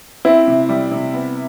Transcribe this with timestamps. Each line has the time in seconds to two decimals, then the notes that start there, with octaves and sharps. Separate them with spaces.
0.25 C4 E4
0.47 C3
0.69 G3
0.91 C3
1.13 B3